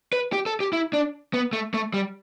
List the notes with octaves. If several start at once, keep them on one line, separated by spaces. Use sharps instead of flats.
B4
G4
A4
G4
E4
D4
B3
A3
A3
G3